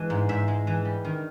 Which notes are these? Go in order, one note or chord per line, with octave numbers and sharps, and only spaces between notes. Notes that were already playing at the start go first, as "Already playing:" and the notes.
Already playing: E3 G#3
G#2
G#2 E5
G#3
E3
G3
D#3